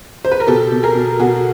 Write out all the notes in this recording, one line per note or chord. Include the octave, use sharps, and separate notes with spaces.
C5
B4
A#4
B2 G4 A4
B2
G#4 A#4
B2
B2 F#4 G#4